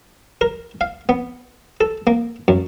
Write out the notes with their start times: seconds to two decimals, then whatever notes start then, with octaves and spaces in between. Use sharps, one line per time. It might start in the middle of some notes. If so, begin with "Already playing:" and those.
0.41 A#4
0.81 F5
1.09 B3
1.81 A4
2.07 A#3
2.48 F#2